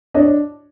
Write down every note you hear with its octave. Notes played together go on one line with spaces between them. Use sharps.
D4 C#5 D#5